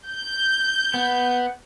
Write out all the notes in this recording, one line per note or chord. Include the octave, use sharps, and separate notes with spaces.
G6
B3